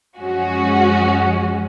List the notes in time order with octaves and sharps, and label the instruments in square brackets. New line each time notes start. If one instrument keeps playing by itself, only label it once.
[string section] F#2 F3 G#3 C#4 F#4